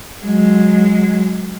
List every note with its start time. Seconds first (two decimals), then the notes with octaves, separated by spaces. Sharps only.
0.24 F#3 G#3